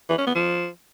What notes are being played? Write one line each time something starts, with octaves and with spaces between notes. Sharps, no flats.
E3
C#4
B3
F3